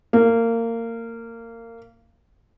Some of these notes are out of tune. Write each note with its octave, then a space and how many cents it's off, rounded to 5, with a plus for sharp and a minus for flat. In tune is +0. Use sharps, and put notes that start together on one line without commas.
A#3 -25